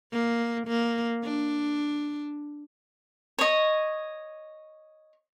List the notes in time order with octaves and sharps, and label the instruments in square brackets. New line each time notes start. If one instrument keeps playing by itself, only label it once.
[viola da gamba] A#3
A#3
D4
[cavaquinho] C#5 D#5